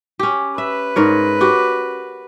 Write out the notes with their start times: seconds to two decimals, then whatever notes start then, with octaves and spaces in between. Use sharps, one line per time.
0.19 C#4 G4
0.58 B4 E5
0.96 G#2 A#4 C#5
1.41 F#4 G4